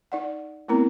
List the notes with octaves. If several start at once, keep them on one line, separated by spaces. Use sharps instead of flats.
D#4 D5 F#5
A3 B3 C4 E4 A#4 A#5